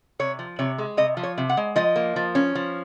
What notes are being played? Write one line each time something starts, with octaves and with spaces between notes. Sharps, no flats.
C3 C#5
F3
C3 C#5
G#3
C3 D#5
F3
C#5
C3
F#5
G#3
F3 D#5
A#3
F3
C#4
F3